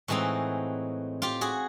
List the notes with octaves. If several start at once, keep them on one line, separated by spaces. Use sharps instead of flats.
A2 E3 G#3 C4 D#4 F#4
F4 G4
F#4 G#4